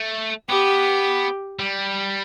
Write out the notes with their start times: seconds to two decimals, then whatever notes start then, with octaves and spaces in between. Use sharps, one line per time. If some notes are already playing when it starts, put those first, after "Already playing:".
Already playing: A3
0.49 B3 G4
1.59 G3